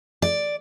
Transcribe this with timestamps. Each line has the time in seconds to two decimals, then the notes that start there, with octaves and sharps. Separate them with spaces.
0.22 D5